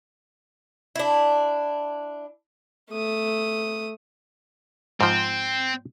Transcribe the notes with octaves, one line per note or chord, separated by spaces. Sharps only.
D4 E4
A3 D#6
G#2 F3 C4